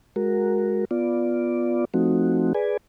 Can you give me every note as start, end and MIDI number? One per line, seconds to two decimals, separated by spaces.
0.16 0.85 56
0.16 0.85 66
0.16 0.85 70
0.91 1.85 59
0.91 1.85 65
0.91 1.85 74
1.94 2.53 53
1.94 2.53 57
1.94 2.53 60
1.94 2.53 63
1.94 2.53 66
2.55 2.77 68
2.55 2.77 71
2.55 2.77 74
2.55 2.77 80